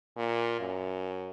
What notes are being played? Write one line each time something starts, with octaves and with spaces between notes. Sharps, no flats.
A#2
F#2